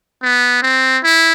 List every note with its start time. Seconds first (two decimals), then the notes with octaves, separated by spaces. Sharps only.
0.23 B3
0.62 C4
1.04 E4